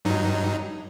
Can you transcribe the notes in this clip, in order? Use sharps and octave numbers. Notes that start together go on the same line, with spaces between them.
G2 F#3 D#4